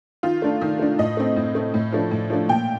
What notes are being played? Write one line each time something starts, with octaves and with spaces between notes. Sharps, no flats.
D#3 F4
A3 D4
D#3
A3 D4
A2 D#5
A3 C4
A2
A3 C4
A2
F3 A3 D4
A2
F3 A3 D4
A#2 G5